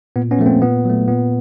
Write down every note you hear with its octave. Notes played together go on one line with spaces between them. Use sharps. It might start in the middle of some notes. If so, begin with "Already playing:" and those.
A#2 B3
B3 C#4
F3 A3
A#3 C4
A#2 B3
F#3 A3
A#2 B3